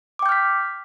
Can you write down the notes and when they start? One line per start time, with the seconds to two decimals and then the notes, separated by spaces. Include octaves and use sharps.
0.19 D6
0.22 G5
0.26 G6
0.29 F6
0.32 B6